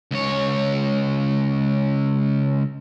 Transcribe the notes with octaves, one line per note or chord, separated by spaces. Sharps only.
C#2 C#5